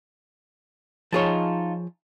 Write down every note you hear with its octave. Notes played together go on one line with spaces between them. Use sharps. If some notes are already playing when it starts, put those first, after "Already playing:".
F3 D#4 F4 G#4 C#5 A5